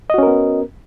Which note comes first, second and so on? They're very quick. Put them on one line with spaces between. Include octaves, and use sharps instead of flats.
D#5 F#4 C#4 A#4 B3